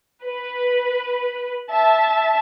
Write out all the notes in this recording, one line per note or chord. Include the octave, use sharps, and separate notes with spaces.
B4
E5 A5